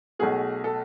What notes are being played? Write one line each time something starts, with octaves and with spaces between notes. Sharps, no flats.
B1 B2 A3 G#4
A4